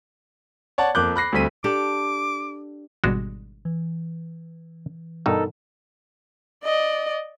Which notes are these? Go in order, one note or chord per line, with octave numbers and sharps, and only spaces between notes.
C#5 D5 F#5 A5
F2 A#3 D6 F#6 G6
B5 F#6 A#6 C7
D2 G3 A3 C4 B6 D#7
D4 G4 A4 D6
G#1 B2 G3 G#3 D4 F#4
E3
G2 B2 D#4 A4 A#4
D5 D#5